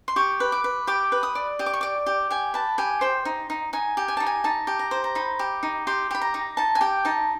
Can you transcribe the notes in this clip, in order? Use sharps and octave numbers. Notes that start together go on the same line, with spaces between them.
C6
G4 C#6
B4
D6
B4
G4 D6
B4
D#6
D5
G4 D#6
D6
C#6
D5 D6
G4
G4 G#5
B4 A5
G4 G#5
C5 G5
D#4
D#4
D#4 G#5
G4
G#5
D#4 A5
G#5
D#4 A5
G4
A#5
C5
A#5
D#4 B5
G4
D#4
G4 C6
G4 B5
A#5
D#4
D#4 A5
G#5
G4 G5
D#4 A5